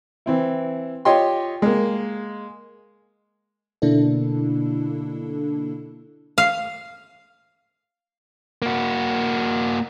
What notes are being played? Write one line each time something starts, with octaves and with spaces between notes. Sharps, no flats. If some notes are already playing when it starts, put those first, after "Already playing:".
E3 C4 E4
F4 G4 C#5 D#5 G5 C6
G#3 A#3
B2 D3 A#3 D4 E4 A4
F5
A#3 F#4